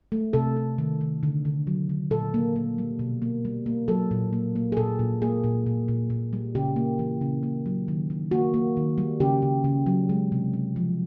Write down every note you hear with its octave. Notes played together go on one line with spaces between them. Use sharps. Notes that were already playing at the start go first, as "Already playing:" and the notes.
A3
C3 A4
C3
D#3
D#3
D3
D3
F#3
D3
A#2 A4
A#3
A#3
G3
B2
A#3
G3
A#3
F#3 A4
A#2
A#3
A#3
G#4
A#2 A4
A#2
A#3 G#4
A#2
A#2
A#2
A#2
G3
C#3 G4
A#3
E3
C#3
A#3
F#3
D#3
D#3
A#3 F#4
A#3
D#3
G3
C#3 G4
C#3
C#3
F#3
G#3
C3
C3
F3